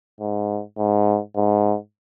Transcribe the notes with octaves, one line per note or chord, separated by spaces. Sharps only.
G#2
G#2
G#2